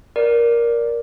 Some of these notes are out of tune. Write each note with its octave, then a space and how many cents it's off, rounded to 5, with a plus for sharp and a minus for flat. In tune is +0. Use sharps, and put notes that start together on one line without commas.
A#4 +10 D5 -5